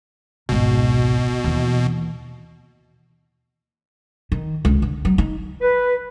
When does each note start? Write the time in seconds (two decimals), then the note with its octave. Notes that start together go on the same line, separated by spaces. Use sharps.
0.49 G#1 C#2 B2
1.44 D#2 E3
4.32 D#3
4.65 C#2
4.82 D3
5.05 F#3
5.18 D#4
5.62 B4